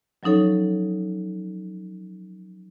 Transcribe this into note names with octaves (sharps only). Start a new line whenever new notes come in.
F3 F#3 C#4 D#4 A4 C#5